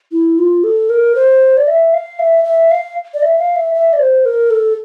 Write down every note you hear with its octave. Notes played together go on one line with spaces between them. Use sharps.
E4
F4
A4
A#4
C5
D5
E5
F5
E5
E5
F5
D5
E5
F5
E5
E5
D5
C5
A#4
A4